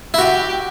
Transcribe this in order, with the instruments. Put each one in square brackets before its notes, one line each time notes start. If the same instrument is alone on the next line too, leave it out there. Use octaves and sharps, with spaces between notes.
[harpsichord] E4
[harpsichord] F#4 [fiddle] G4